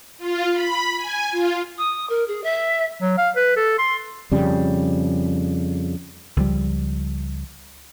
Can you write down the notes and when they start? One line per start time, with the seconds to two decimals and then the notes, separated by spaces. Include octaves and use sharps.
0.18 F4
0.52 B5
0.96 G#5
1.31 F4
1.78 D#6
2.09 A#4
2.28 G#4
2.43 E5
3.01 F#3
3.18 F5
3.36 B4
3.56 A4
3.78 C6
4.32 F2 C#3 G3
6.36 C#2 F3 G3